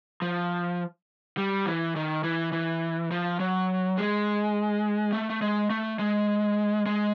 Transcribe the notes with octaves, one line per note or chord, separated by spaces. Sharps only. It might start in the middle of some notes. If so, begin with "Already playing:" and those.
F3
G3
E3
D#3
E3
E3
F3
F#3
G#3
A3
A3
G#3
A3
G#3
G#3